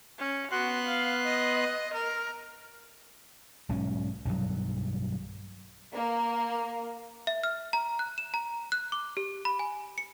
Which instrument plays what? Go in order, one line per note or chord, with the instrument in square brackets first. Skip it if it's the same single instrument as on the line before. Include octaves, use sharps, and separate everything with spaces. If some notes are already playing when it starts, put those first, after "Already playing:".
[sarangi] C#4
[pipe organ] B3 C6 F#6 [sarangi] F#4
[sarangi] F5
D#5
A#4
[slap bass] B1 G#2 F#3 C#4
B1 G2 D#3 F#3
[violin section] A#3
[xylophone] E5
F6
A#5
F#6
E7
A#5
F#6
D6
G4
B5
G#5
C#7